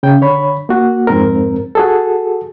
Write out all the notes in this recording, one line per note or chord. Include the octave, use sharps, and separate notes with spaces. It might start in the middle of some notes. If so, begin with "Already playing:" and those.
C#3 G5
D3 C#5 B5
A#3 F#4
F2 G#2 C4 A#4
F#4 G#4 A4